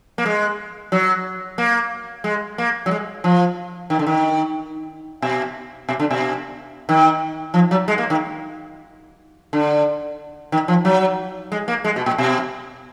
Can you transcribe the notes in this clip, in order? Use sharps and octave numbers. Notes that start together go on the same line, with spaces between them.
A#3
G#3
F#3
A#3
G#3
A#3
F#3
G#3
F3
D#3
D3
D#3
B2
B2
D3
B2
D#3
F3
F#3
G#3
A#3
D#3
D3
D#3
F3
F#3
G#3
A#3
G#3
B2
A#2
B2